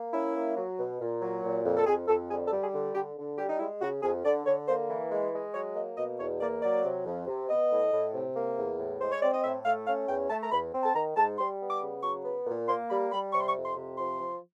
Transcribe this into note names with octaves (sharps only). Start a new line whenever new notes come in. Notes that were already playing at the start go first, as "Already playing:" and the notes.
Already playing: A#3
C#4 E4
A#3
F#3
B2
A#2
F#3
A#2
F2
A4
F2 G#4
F2 A4
D3 G#4
A4
G3
G#4
D3
D3 G4
D3
G3 G4
D#4
G#3 E4
C#3 F#4
F2 G#4
D3 D5
D3 C#5
A#3 C5
E3
G#3
G#3
F#3 C#5
A#3 D#5
B2 D#5
E2 C#5
A#3 D5
F#3 D5
C3
F2
C3
B3 D#5
A2
A2
C3
A#3
E2
A2
G#3 C5
C#5
C4 D5
D#5
A2 E5
A3 F5
C#4 F5
E2 G5
A3 A5
A#5
E2 B5
C4
A5
D#3 A#5
G#2 A5
G3 C6
B3
D6
C#3
F#3 C#6
B3
A#2
A#3 C6
G3 B5
G3 B5
C3 C#6
C6
C#6
F2
C6
C3
F3 C6
F3